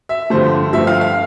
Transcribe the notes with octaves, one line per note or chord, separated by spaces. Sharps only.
E5
G2 D3 F3 A3 C5
G2 F3 A3 E5
F5
F5